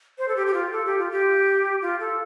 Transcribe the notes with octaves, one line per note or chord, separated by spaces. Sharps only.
C5
A4
G4
G4
F4
A4
G4
F4
G4
F4
A4